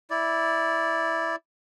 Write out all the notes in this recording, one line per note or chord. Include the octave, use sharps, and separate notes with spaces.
E4 D5